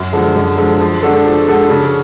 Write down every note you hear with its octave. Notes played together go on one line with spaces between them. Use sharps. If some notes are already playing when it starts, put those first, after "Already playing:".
Already playing: F#2
D3 F3 G#3
F#2
D3 F3 G#3
F3
G#3 D4 F#4 A4
F3
G#3 D4 F#4 A4
C#3